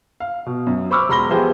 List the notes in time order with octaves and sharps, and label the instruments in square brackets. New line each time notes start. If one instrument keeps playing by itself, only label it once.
[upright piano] F5
B2
F#2
C5 B5 C#6 D6 E6 F6
E1 B5 C6 A#6 G7
E3 F3 B3 G4 G#4 C5